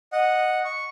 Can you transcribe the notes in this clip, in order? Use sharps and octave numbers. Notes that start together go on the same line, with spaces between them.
D#5 F#5
C#6